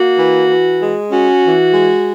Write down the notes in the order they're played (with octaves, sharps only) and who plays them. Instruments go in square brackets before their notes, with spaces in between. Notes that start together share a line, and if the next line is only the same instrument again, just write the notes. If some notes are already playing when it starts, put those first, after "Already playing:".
Already playing: [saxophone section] A#3 F#4
E3
E3
G#3
C#4 F#4
E3
G#3